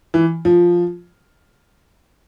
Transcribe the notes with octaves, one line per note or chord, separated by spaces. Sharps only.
E3
F3